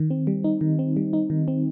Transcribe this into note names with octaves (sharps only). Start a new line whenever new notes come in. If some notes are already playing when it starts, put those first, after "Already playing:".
Already playing: D#3
C4
G3
D#4
D#3
C4
G3
D#4
D#3
C4